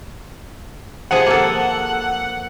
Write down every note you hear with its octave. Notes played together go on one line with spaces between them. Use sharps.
C3 F3 G#4 F#5
A#3 A4